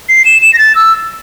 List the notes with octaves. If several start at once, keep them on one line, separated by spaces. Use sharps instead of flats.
C7
E7
E7
A#6
A6
E6